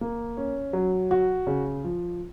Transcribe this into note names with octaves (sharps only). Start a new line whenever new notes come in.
A#3
C#4
F#3
F#4
C#3
F3